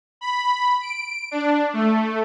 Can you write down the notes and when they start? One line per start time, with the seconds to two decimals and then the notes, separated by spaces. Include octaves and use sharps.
0.21 B5
0.81 D7
1.31 D4
1.73 A3